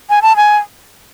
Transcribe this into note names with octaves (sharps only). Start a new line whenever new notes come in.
G#5
A5
G#5